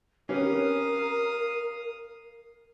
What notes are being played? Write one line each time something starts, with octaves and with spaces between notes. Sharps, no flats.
C#4 G4 A#4 B4 F5 D#6